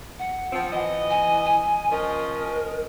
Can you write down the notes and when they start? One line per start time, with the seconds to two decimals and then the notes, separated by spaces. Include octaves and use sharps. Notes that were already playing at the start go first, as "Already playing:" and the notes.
0.19 F#5
0.52 F3 C4
0.72 E3 D#5
1.10 G#5
1.45 G#5
1.91 F3 C#4 A#4 D#5